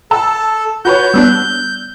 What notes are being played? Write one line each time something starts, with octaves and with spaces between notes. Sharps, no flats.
A4 A5 E6
F#4 B4 C#5 G6
G3 B3 D4 E6 F#6